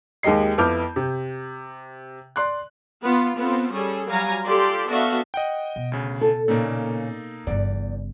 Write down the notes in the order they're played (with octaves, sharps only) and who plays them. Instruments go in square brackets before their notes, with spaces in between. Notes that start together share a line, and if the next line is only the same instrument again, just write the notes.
[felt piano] D#2 G#3 G4 D#5 C7
F2 B3 E4 D6 F6 G6
C3
D5 C6 F#6
[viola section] B3 F4
B3 C4 F4 A4
G3 C#4 G#4 A4
F#3 G3 F5 G#5 A#5
F4 G4 A4 D5 C6
B3 D4 F#4 A4 E5 F5
[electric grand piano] D#5 F#5 G5
[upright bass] B2
[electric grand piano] D2 C#3
[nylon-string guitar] A4
[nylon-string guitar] A#2 C#3 [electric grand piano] A#3 D#4 A4
[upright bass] G1 C#3 [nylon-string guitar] E2 D5